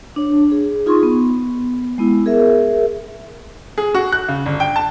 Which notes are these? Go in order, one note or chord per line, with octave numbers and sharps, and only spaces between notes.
D4 C#5
G#4
D#4 F4 G#4 C6 C#6
B3
G#3 B3 E4
G#4 A#4 E5
G#4
F#4
F#6
C#3
G1
G5
A5